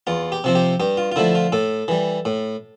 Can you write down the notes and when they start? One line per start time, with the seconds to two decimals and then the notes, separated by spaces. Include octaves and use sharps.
0.07 E2 F4
0.32 G4
0.44 C3 F3 C4
0.55 G4
0.80 G2 G4
0.97 F4
1.12 F4
1.16 D3 F3 A3 E4
1.35 F4
1.52 A2 A4
1.88 E3 G3
2.25 A2